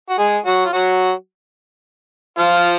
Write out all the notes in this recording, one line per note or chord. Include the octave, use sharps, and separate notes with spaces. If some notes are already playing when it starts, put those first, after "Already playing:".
F#4
G#3 G#4
F#3 F#4
F4
F#3 F#4
F3 F4